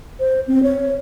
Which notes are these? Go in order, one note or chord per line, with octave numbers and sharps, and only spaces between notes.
C5
C4
C#5